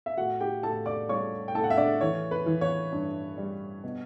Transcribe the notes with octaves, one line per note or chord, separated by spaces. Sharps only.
E5
A2 F#4 F#5
G4 G5
A2 A4 A5
D5 D6
G3 C#5 C#6
G5
A2 A4 A5
F#5
E5
D4 D5
E3 C#5
B4
E3
C#5
G2
G3
B2